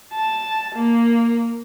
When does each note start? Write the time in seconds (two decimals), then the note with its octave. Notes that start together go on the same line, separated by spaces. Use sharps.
0.14 A5
0.76 A#3